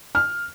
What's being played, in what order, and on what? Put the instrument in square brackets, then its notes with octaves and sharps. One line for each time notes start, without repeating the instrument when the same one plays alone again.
[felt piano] F6